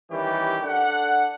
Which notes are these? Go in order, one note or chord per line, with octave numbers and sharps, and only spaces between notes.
D#3 E3 G3 C#4 G4
D4 A4 F#5